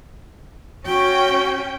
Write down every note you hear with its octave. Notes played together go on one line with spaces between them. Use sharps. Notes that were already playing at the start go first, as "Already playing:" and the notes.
C#4 F#4 G5